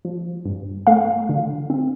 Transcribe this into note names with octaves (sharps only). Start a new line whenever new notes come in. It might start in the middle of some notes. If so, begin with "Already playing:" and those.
F3
G2
A3 F5
D3
C4